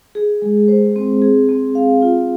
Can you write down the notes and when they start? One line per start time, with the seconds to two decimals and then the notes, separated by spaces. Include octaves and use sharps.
0.15 G#4
0.42 G#3
0.68 C5
0.96 C4
1.22 G#4
1.49 C4
1.75 F5
2.02 F4